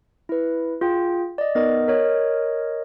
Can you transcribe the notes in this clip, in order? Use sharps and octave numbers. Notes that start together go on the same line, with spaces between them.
E4 B4
F4 G#4 G5
D5 D#5
B3 D#4 A#4 D#5
A#4 C#5 D#5